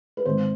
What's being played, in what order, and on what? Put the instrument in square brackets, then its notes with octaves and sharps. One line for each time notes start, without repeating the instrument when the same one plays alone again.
[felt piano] B4
G#1 C5